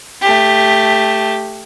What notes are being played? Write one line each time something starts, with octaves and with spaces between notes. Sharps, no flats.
A3 G4